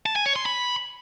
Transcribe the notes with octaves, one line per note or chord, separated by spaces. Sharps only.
A5
G#5
C#5
C6
B5